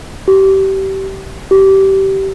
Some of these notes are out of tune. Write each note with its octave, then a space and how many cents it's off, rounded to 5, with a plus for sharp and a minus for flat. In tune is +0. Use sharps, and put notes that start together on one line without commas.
G4 -25
G4 -20